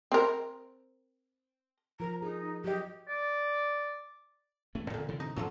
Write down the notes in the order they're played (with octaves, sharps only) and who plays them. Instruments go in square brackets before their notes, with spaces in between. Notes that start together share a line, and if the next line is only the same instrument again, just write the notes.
[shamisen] C4 A#4
[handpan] F3 A#4 [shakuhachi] A#5
[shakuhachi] D#4 [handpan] G#4
[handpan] F#3 D#5 [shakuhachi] G4
[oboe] D5
[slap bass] E1 A3 C#4
[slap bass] E2 [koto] A#2 D3
[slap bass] C3 E3
[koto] D#4
[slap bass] D2 G#2 C#4 [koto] D3 F3 F#3